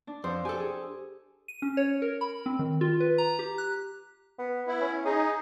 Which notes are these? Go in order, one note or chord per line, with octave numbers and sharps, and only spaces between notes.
D4
F2 C5 F#5
G4 A4 G#5
G#4
D#7
C#4
C#5
A#4
B5
C4
D#3
F4
B4
A#5
G4
F#6
B3
B3 E4
C#4
D#4 G#4